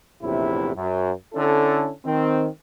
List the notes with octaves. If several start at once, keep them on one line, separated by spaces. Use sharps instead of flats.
A#1 E2 A2 C3 E4
F#2
D3 C#4 E4 A4
D#3 C4